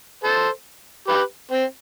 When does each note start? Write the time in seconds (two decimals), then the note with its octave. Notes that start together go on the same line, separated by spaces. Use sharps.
0.23 A4 C5
1.08 G4 B4
1.51 C4